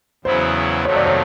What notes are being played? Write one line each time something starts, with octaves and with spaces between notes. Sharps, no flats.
E2 C#3 F#3 B3 E4 C5
F2 C3 D#3 F#3 A3 C#5
D5
C#5